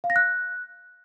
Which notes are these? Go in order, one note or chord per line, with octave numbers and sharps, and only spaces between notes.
F5
A#6
F#6